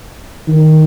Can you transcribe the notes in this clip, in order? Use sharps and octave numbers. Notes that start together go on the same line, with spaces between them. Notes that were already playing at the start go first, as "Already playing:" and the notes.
D#3